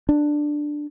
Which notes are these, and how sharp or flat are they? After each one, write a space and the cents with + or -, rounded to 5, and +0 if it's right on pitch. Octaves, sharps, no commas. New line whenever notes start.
D4 +10